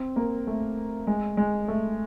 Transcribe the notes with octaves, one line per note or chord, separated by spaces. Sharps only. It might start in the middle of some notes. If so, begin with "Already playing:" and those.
Already playing: C4
A#3
A3
G#3
G#3
A3